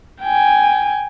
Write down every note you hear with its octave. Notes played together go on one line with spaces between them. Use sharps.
G5 G#5